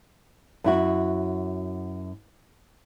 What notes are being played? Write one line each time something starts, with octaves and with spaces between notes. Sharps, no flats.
F#2 E4 F#4